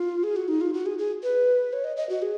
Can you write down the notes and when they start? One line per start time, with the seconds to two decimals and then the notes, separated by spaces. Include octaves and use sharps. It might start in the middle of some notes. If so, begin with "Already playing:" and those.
Already playing: F4
0.24 G#4
0.36 F#4
0.48 D#4
0.61 F4
0.73 F#4
0.86 G#4
0.98 G#4
1.23 B4
1.73 C#5
1.84 D#5
1.97 D#5
2.09 F#4
2.22 G#4